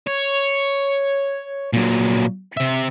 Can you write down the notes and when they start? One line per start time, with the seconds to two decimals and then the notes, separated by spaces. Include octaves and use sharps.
0.07 C#5
1.73 A#2 F#3
2.57 C3 E5